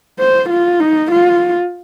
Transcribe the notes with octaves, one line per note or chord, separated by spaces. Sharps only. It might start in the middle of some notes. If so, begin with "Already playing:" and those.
C5
F4
D#4
F4